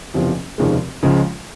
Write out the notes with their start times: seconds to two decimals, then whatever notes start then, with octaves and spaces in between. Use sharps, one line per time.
0.14 F#1 E2 C3 F3
0.58 F1 D#2 C#3 F3 G#3
1.03 C#2 C#3 F3 G#3